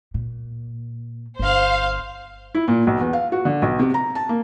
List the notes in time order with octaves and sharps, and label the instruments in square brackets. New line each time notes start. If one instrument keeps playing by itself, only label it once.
[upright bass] A#2
[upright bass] G1 [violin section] C5 F5
[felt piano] E4
A#2
B1
E2
F5
F#4
D3
B1
C3
A#5
A5
A#3